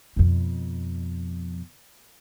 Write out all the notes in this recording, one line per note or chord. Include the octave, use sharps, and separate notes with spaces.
F2 B2